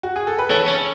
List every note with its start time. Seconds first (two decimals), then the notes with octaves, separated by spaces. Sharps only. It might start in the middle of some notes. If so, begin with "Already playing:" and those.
0.03 F#4
0.16 G#4
0.27 A4
0.38 B4
0.50 E3 A4 C#5
0.68 C#4